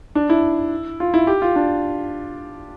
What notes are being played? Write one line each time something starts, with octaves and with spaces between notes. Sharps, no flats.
D4
E4
F4
E4
G4
F4
D4